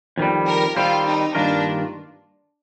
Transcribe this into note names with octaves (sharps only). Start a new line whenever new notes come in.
F2 D#3 G3
A#4
D#3 G3 C4 F4
D#4
G2 D#3 A#3 D4 F4 A#4